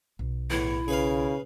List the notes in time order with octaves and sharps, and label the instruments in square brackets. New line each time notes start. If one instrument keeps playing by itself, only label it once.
[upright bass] B1
[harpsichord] E2 A2 [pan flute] E4
[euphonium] C#3 [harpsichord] G#4 B4 F5